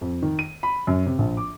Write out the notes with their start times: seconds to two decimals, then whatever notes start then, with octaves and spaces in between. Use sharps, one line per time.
0.01 F2
0.22 D#3
0.39 D#7
0.63 B5
0.87 F#2
1.06 C3
1.18 A#1
1.37 D6